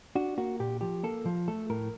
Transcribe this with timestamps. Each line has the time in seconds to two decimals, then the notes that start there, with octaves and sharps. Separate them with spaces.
0.15 D4 F#4
0.38 A#3 F#4
0.60 A#2 G4
0.81 F3 G4
1.03 A#3 A4
1.25 F3
1.48 A3 A4
1.70 A2 A#4